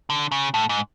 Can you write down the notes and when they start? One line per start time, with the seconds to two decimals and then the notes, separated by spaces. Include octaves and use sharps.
0.10 D3
0.32 C#3
0.54 A2
0.69 G#2